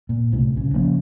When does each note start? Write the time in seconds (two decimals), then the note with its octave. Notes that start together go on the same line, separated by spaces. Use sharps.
0.09 A#2
0.32 C2 A2 C3 A3
0.53 A#1 C#3
0.74 C#3 F3 A#3 C#4